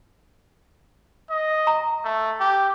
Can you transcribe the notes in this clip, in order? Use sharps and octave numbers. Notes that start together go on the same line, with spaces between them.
D#5
A#5
A3
G4